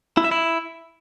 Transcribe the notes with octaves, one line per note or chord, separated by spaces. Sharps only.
E4
E5
E4